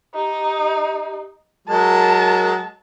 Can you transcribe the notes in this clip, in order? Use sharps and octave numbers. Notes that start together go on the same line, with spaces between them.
D#4 G4
F#3 G#3 A#4 A5